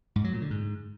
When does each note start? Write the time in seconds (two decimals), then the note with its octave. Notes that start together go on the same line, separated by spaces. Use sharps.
0.16 G#2
0.24 F#3
0.33 A#2
0.42 D3
0.50 G#2